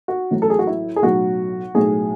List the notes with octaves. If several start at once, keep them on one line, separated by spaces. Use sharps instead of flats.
F#4
A1 A2 F#3
A4
G#4
F#4
E4
G#4
B1 A2 F#3 F#4
B1 A2 F#3 G#4